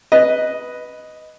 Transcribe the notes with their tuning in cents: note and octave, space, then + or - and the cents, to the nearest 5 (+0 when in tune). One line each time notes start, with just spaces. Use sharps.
B4 +0 D#5 +0